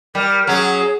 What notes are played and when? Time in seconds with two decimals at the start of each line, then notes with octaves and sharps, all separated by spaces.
0.15 G3 A#4
0.47 F#3 C#4 G#4